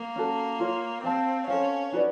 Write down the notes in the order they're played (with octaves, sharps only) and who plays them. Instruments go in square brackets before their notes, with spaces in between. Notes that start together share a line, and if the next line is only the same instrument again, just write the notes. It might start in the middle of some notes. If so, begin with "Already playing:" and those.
Already playing: [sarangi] A#3
[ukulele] C#4 F#4 A4
F4 A#4 C#5
[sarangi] C4 [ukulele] G4 C5 F5 A5
[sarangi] C#4 [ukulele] A4 C5 F5
[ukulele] D#4 F#4 B4 D5